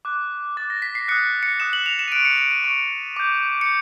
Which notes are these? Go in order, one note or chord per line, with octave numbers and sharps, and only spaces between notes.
D6 F#6
D6 F#6 A6
A#6
B6
C7
D#6 F#6 C#7
C#7
D#6 F#6 E7
F#7
F7
E7
D#7
C#6 F#6 D7
C#7
D7
D#7
C#6 F#6 D7
D6 G6
C#7